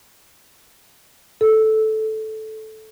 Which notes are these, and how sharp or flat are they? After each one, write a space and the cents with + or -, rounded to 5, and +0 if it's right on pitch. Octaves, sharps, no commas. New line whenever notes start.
A4 -10